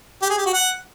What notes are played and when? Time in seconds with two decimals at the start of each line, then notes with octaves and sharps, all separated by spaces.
0.22 G4
0.30 G#4
0.38 G4
0.46 F#4
0.54 F#5